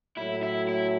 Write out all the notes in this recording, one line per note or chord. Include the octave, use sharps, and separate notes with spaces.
A2 F#3 A3 E4
E4
E4